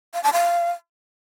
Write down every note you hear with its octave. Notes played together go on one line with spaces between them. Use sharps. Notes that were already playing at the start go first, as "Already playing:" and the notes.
F5
A5
F5